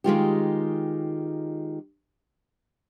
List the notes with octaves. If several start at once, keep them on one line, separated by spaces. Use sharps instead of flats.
D#3 G#3 F4 G4